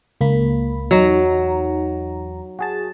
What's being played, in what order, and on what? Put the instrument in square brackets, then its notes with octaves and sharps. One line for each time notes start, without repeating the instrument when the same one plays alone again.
[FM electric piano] C#2 A#3 B5
[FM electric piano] E2 D#4 A#5 [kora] F#3
[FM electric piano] F#4 G#4 A5